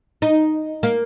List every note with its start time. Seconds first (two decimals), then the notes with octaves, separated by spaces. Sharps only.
0.22 D#4
0.83 A#3